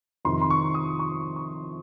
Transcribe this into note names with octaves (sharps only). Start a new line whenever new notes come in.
F2 C3 D#3 C6
C6
C#6
D#6
C#6
C#6